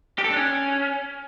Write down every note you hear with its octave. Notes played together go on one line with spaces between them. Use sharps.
G4
A4
D4
C#4